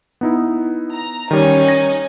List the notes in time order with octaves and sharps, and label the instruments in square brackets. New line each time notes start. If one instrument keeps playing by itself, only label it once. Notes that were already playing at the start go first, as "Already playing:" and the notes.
[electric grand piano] B3 D#4 E4
[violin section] A#5
[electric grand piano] D#3 G3 [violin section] C#4 D#4 G#5
[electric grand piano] A#6